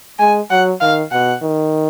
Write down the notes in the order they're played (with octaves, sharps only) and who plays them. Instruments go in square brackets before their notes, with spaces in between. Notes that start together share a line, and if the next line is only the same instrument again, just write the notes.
[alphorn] G#3 [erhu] G#5
[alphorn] F#3 [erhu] F#5
[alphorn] D#3 [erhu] F5
[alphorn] B2 [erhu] F#5
[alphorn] D#3